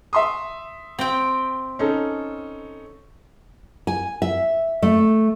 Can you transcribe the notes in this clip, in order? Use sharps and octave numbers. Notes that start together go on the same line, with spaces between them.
E5 C6 D#6
C4 G5
C#4 D#4 A4
G#5
E5
A3